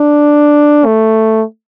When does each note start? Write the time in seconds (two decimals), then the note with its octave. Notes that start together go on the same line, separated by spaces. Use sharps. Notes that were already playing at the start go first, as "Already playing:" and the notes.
Already playing: D4
0.85 A3